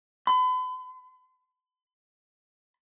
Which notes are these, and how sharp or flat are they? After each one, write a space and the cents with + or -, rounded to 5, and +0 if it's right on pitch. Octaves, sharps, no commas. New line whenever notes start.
B5 +40